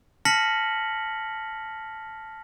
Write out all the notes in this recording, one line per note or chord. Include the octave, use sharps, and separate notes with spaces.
A5 F6 A#6 B6 C#7 F#7